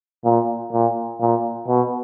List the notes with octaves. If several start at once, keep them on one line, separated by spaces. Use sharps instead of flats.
A#2
A#2
A#2
B2